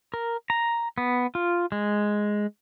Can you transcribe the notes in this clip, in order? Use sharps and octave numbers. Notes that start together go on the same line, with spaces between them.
A#4
A#5
B3
F4
G#3